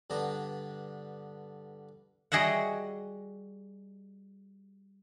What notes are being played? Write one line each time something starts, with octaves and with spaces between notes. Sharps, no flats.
G2 D3 B3 D4 A#5
G3 F#4 G#4 D#5 E5 F#5